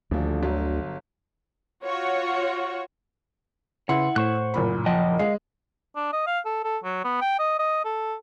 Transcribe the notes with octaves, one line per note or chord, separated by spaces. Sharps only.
D#1 D2 F3
G1 F#3
F4 F#4 C#5
C#3 E4 B4 F#5 C6
A2 C5 C#6 F#6
F#1 A#2 B5
F3 D#5 F#5 G5 A5
G#3 F5
D4
D#5
F5
A4
A4
F#3
B3
G5
D#5
D#5
A4